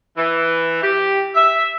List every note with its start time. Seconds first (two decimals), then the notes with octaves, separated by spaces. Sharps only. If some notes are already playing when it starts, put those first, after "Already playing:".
0.17 E3
0.82 G4
1.35 E5